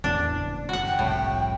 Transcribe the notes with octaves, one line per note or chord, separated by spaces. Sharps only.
E2 A2 E3 D4
F#1
F#4 F#5
G5
F#1 C2 F2 A2